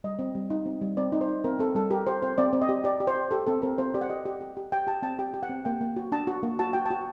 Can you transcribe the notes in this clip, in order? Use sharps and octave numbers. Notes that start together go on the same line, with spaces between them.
G3 D#5
C4
G3
D#4
C4
G3
C4 D5
D#4
C5
D#4
C4 A#4
C4 A4
G3 A4
G4 A#4
G4 C5
C4 C5
C4 D5
C4
D#5
G4
G4 D5
G4
C5
G4
G4 A4
C4 A4
C4 A#4
C4 C5
G4 D5
F#5
G4 D#5
G4
G4
G4
G4 G5
G4 A5
C4 A5
G4 G5
G4
F#5
C4
A#3 G5
A#3
F#4
D4 A5
F#4
A#3
F#4 A5
F#4 G5
A5
F#4